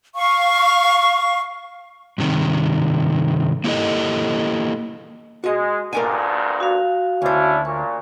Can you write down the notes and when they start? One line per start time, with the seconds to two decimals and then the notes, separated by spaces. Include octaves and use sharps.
0.16 F5 C#6
2.18 G2 C3 D#3
3.64 A#3 E4 G4 A4 D#5
5.44 G#3 F#4 D#5
5.93 D2 G2 A#2 A#4 D5 G#5
6.60 F#4 F5
7.22 D2 C#4 D4 E4 C5
7.65 A#2 C#6